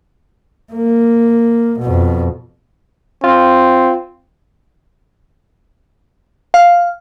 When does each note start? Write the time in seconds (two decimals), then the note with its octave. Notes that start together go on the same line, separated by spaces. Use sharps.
0.73 A#3
1.79 F2 B2
3.24 C4 F4
6.54 F5